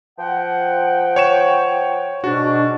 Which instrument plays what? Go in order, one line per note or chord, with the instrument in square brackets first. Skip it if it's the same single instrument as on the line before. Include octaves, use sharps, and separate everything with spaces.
[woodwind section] F3 F#5 G5
[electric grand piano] C#5 C#6 E7
[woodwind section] G#2 B2 D4 [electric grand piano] F#4